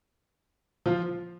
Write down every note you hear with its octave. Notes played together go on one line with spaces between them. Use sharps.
F3 F4